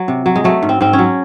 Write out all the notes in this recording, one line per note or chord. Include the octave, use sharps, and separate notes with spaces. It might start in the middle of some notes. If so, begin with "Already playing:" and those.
Already playing: F#3
C3
F#3
G#3
F#3 A3
G#2
C4
G#2 C4
C#4
F#3